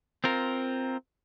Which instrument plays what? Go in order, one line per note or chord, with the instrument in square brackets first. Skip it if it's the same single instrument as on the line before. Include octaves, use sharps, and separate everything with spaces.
[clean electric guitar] C4 F4 A#4